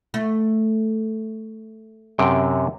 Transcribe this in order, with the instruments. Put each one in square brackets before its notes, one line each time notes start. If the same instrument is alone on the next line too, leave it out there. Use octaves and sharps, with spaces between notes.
[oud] A3
[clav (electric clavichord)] F#2 C3 G5